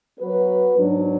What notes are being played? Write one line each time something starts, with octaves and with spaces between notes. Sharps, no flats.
F#3 B3 F#4 B4
G#2 F#3 B3 D4